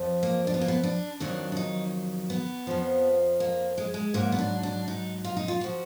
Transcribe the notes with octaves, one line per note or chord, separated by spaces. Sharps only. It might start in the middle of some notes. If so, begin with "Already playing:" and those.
Already playing: F2 F3
A#3
D4
B3
A#3
B3
D4
F2 D#3 F#3 D4
D4
D#4
B3
F2 F3
A#3
G#3
G#3
G#2 F#3 A#3
B3
D4
D4
D#4
F4
D#4
F4
F3 F#4